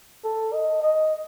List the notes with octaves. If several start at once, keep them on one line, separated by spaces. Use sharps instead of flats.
A4
D#5
D#5